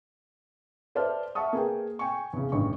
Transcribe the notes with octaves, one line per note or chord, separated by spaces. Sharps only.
B4 C5 D5 E5 A5 F6
E5 F#5 A5 C#6 D#6
A#3 G#4 B4 G5
G5 G#5 C#6
E2 C#3
A1 G2 D#3 C#6